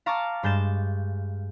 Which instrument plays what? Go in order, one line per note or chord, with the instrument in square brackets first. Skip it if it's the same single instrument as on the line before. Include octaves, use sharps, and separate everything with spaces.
[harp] F5 A5 A#5 C#6 D6 A6
G2 G#3 G6 A6 E7